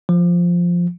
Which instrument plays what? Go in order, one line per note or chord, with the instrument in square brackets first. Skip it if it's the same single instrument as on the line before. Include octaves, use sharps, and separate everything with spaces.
[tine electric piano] F3